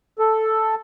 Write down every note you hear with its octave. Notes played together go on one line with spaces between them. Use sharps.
A4